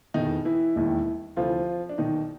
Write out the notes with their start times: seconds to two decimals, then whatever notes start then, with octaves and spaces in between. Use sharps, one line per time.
0.14 F1 E2 B2 D#3 D#4
0.45 E3 E4
0.76 E1 D#2 D#3
1.37 D2 C3 E3 F3 F4
1.89 D4
1.98 B1 B2 D#3 D#4